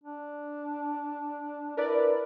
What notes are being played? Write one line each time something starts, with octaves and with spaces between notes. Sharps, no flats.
D4
E4 A#4 B4 D5